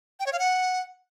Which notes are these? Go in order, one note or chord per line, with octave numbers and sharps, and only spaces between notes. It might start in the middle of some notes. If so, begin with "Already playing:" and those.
G5
C#5
F5
F#5